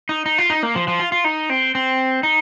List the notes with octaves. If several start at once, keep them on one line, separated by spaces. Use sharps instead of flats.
D#4
D#4
F4
D#4
A#3
F3
F3
F4
F4
D#4
C4
C4
D#4